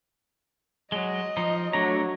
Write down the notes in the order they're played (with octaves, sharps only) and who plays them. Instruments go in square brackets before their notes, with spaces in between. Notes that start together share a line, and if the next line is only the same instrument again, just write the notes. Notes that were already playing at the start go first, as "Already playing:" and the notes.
[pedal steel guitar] F#3 G#3 [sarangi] D#5
[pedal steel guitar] F3 D#4
[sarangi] F#3 [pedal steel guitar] A3 D4 A#5